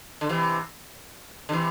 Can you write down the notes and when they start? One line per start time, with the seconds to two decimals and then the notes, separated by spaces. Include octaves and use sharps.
0.21 D3
0.29 C3 E3
1.49 D3
1.52 C3 E3